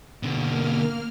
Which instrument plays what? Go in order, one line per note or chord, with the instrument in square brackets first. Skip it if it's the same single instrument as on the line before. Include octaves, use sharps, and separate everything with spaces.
[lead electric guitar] B2 D3 [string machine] A#3 F6